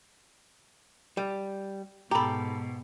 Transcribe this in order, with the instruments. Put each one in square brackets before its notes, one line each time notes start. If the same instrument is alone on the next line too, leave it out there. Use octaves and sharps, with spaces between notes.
[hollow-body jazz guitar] G3
[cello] G#2 B2 [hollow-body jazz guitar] G4 A4 [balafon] A#5 B5